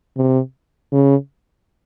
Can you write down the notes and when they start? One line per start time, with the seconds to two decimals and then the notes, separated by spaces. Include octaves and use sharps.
0.17 C3
0.93 C#3